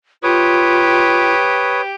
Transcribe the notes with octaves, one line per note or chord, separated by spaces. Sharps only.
F4 G4 B4 C#5 D#6